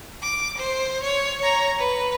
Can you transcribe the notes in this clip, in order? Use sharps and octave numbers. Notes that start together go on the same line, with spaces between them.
D6
C5
C#5
C#5 A#5
B4